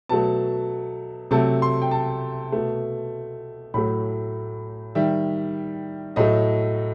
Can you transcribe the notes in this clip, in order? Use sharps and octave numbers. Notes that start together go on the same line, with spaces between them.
B2 F#3 A3 A5
C3 F#3 A3 A5
C6
G5
A5
B2 A3
A2 F#3 A3 B5
D#3 G3 E5
A2 F#3 A3 D#5